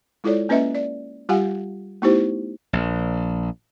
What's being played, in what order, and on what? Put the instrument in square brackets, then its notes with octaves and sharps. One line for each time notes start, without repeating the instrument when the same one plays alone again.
[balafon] G#3 E4 F4 A4 C#5 D5
A#3 C#4 B4 D#5 E5
D5
G3 F4 G4 F5 F#5 G#5
A3 B3 D#4 E4 G4 C5
[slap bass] A#1